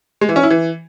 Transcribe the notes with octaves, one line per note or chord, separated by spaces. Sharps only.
G#3
E3
C#4
E4
E3